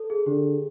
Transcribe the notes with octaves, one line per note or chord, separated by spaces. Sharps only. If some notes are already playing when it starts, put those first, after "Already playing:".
Already playing: A4
G#4
D3 G4